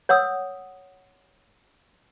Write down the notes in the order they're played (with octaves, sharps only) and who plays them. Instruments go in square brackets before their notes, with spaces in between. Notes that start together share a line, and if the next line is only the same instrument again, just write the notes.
[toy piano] C#5 F#5 D#6 E6